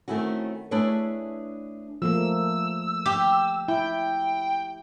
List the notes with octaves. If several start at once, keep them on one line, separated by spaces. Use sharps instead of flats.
D#3 A3 C4 C#4 E4 F#4
A3 D4 E4 G#4 B4 C#5
F3 A3 A#3 E6
G4
E4 G5